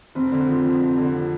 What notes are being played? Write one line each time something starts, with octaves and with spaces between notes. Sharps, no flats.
F1 C4
D3
F3
F2
F1
D3
F3